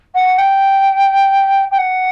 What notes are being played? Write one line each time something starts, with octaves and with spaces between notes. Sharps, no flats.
F#5
G5
G5
F#5